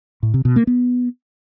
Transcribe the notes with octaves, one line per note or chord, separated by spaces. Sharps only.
A2
C3
B2
A#3
B3